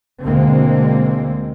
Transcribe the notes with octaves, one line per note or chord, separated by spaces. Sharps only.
D2 B2 D3 G#3 A#3 C4